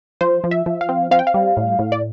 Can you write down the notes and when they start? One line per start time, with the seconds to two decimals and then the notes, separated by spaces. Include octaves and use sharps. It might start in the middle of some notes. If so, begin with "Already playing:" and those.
0.21 F3 C5
0.44 F3
0.51 E5
0.66 F3
0.81 F5
0.89 C4
1.11 C4 F5
1.19 G5
1.27 F5
1.34 G3
1.57 A2
1.79 A2
1.92 D5